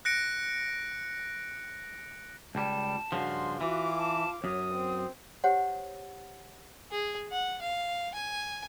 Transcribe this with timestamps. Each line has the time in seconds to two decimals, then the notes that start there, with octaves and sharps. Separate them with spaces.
0.05 F#6 A#6 C#7 D7
2.55 C#2 G3 A5
3.12 G2 C#3 F3 F#4 C6
3.61 E3 F4 F#4 D6
3.97 A5
4.44 F#2 C#5 D#6
4.74 C4
5.44 G4 C5 C#5 F#5
6.92 G#4
7.31 F#5
7.62 F5
8.14 G#5